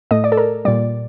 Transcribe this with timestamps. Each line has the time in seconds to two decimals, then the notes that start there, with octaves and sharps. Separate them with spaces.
0.11 A2 A3 D#5
0.24 D5
0.32 A4
0.37 A#4
0.65 A#2 G3 D5